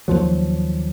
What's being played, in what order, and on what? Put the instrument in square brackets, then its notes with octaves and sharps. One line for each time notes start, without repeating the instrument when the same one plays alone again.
[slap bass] D#2 F3 F#3